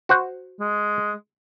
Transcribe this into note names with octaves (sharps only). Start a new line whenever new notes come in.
F#4 C5 F#5
G#3